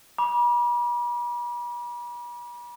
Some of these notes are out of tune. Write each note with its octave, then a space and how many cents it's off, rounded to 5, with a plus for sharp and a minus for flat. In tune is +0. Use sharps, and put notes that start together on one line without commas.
B5 -45 D6 +0